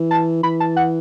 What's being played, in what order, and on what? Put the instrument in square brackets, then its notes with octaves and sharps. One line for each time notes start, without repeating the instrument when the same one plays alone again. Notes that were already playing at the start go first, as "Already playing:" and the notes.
Already playing: [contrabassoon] E3
[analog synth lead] A5
[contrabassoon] E3 [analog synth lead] B5
[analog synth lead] A5
F#5